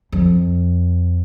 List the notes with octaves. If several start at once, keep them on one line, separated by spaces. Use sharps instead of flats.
F2